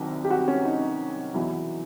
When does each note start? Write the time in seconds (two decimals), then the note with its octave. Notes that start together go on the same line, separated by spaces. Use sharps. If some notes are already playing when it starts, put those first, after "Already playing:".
Already playing: C2 C3 D#3 F#3
0.24 G4
0.30 F#4
0.48 C#4
0.65 D#4
1.34 E2 B2 F#3 E4